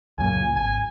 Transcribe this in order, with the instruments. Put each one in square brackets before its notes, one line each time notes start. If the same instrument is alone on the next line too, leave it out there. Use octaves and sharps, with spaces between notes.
[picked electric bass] C#2 F#2 A#2 [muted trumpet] G#5
[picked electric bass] G#1 [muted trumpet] G#5